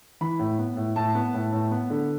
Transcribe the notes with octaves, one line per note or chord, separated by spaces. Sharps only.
E3 B5
A2
B3
A2
A2 A5
B3
A2
A2
B3
D3